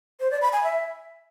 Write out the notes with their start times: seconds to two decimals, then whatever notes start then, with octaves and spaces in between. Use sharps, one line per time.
0.20 C5
0.31 D5
0.42 B5
0.53 G#5
0.63 E5